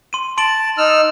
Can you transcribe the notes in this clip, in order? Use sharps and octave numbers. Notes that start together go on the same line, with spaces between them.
C6 D#7
A5 C6 D7 F#7
D#4 E6 F6